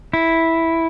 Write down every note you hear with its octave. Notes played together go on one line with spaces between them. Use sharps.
E4